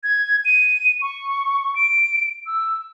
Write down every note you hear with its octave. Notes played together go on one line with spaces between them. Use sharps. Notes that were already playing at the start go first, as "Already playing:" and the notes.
G#6
D#7
C#6
D7
E6